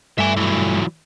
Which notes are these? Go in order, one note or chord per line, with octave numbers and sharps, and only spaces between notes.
G2 A3 E5 G#5
E3 F#3